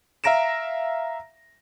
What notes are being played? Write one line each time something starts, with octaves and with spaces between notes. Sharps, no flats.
E5 F5 A#5 A#6 D7 E7